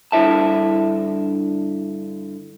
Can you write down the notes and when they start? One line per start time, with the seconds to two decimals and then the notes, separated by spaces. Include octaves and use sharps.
0.12 G2 D3 E4 E5 A5